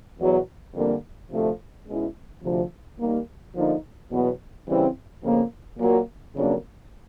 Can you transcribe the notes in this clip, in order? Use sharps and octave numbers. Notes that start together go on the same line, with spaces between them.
E2 B2 F#3
F2 D3 G3 A#3 D4
D2 C3 F3 A3 C4
B2 G#3 C#4 E4
D2 C3 F3
D#2 D#3 G3 A#3
D3 F3 A#3 D#4
E2 B2 F#3 B3
C#3 E3 G3 C4 E4
F2 C#3 F3 A#3
A#2 F#3 A#3
F2 C#3 F#3 A#3 D4